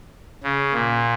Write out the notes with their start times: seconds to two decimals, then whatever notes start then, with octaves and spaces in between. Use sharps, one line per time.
0.43 C#3
0.73 A#2